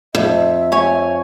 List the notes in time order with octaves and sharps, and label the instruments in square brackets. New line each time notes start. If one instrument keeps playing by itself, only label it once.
[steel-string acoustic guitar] F2 [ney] E5
[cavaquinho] C#5 G#5